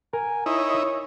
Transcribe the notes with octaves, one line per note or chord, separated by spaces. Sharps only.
A#4 G#5
D#4 E4 C#5